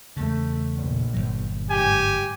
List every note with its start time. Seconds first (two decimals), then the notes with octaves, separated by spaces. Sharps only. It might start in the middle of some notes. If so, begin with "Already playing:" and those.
0.17 E2 C#3 A3
0.77 A#1
1.14 G1 C2 F#3
1.70 G#2 G4 G#5